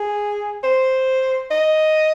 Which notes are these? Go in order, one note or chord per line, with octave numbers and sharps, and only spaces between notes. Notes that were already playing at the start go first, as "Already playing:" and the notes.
Already playing: G#4
C5
D#5